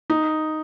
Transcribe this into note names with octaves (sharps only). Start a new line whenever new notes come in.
D#4